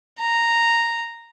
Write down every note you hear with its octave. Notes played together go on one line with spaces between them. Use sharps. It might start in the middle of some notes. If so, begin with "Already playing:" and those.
A#5